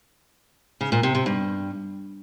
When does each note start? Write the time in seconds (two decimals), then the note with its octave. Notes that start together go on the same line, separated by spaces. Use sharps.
0.81 C#3
0.92 A#2
1.03 C3
1.15 C3
1.26 G2